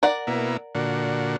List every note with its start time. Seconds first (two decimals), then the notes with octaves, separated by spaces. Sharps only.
0.03 A#4 D5 F#5
0.27 B2 A#3 E4
0.75 A#2 D3 F#4